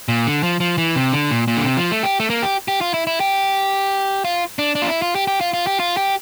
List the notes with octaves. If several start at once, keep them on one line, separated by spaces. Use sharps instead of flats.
A#2
D3
F3
F3
E3
C3
D3
A#2
A#2
D3
C3
F3
A3
G4
A3
A#3
G4
G4
F4
E4
E4
G4
F4
D4
D4
F4
E4
F4
G4
G4
F4
F4
G4
F4
G4